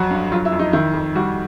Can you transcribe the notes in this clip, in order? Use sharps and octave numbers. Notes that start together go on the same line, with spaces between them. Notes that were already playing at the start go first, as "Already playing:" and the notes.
Already playing: F2 F#3 F#4
G2
F#3 F4
E4
F2
D#4
D#3 E4
F2
G3 F#4